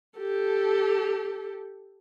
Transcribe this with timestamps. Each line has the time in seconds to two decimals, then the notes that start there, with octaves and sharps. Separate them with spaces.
0.18 G4 A4